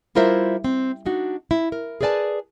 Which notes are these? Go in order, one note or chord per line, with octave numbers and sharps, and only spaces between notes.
G3 E4 F4 A#4 C5 E5
C4
D4 D#4 F#4
E4
A#4
G#4 A#4 B4 D5 G#5 A5